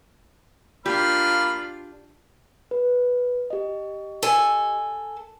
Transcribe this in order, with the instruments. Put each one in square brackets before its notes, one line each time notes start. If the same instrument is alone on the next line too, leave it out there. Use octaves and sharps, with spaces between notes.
[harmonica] A#3 B5 F6 [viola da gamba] D4 F4 [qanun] G4
[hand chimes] B4
G4 D#5
[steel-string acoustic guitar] A4 G#5